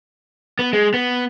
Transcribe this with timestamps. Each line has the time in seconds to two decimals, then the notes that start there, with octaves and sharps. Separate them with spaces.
0.59 B3
0.73 G#3
0.94 B3